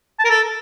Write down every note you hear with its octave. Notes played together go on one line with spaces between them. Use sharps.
A5
A#4
A4